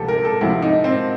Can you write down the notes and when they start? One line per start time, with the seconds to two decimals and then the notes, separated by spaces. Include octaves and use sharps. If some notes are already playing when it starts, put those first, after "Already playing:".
Already playing: D2 C3 F3 G4 A4
0.08 A#4
0.25 A4
0.41 D2 C3 F3 E4
0.62 D#4
0.84 C4